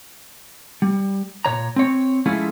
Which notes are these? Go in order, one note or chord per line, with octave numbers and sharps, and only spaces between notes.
G3
A#2 C#5 A#5
C4 C#5
F3 G#3 A3 C#4 E4 F4